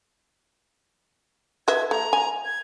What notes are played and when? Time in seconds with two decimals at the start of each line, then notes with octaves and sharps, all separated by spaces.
1.68 B4 D#5 E5 G#6
1.91 A3 A#5
2.13 G#5
2.45 G#6